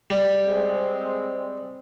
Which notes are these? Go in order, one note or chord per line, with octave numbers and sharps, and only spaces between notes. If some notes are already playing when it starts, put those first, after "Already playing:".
G3
G#3 C4